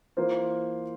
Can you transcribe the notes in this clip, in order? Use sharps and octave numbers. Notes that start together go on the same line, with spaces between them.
E3 A#3 F4 C5